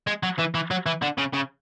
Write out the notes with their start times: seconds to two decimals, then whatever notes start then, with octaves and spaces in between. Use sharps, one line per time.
0.07 G#3
0.23 F#3
0.39 E3
0.55 E3
0.71 F#3
0.86 E3
1.02 D3
1.18 C#3
1.34 C#3